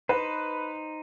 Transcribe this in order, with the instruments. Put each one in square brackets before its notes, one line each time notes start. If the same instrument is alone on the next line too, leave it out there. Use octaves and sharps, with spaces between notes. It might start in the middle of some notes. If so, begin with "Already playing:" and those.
[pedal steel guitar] D#4 C5 [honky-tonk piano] B4